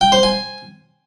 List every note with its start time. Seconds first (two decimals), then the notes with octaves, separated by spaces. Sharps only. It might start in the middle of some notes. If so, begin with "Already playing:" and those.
0.01 G5
0.12 C5
0.23 G#5